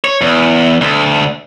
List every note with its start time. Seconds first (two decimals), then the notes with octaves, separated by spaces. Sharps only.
0.04 C#5
0.21 E2
0.81 D2